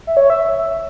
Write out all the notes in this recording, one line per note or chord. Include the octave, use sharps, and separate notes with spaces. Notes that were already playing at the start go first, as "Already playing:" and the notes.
E5
C#5
E5